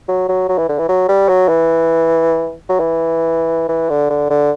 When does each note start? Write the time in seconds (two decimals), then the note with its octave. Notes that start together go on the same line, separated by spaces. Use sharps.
0.08 F#3
0.29 F#3
0.49 F#3
0.58 E3
0.69 D3
0.79 E3
0.89 F#3
1.09 G3
1.29 F#3
1.49 E3
2.69 F#3
2.80 E3
3.69 E3
3.90 D3
4.10 D3
4.30 D3